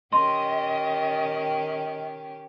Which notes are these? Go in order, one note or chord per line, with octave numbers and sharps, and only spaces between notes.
D#3 C#4 G4 D#5 C6